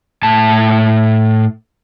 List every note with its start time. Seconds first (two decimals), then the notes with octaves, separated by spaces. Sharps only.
0.23 A2 A5